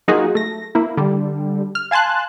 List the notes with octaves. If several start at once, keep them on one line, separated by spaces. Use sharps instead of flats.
F#3 A#3 D#4 F4 F#4 G#4
A3 A#6
A#3 E4
D3 G3
F6
F5 G#5 A5 C6 F#6